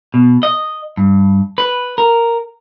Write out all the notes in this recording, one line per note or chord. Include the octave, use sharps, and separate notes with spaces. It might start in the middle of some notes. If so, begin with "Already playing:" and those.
B2
D#5
G2
B4
A#4